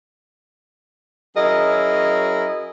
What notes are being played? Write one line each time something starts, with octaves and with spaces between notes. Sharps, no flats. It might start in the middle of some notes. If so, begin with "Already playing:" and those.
F#3 C#4 E4 G#4 A#4 D#5